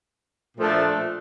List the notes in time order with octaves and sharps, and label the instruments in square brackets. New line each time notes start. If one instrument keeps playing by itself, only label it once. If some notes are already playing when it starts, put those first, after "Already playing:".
[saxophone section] A#2 F3 A3 D4